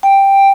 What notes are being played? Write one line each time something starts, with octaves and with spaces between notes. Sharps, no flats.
G5